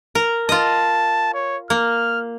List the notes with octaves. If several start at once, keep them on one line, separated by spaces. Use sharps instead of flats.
A#4
F4 D#5 A5
C#5
A#3 F6